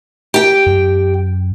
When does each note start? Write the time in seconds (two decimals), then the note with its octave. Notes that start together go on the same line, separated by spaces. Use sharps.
0.34 G4 G5
0.66 F#2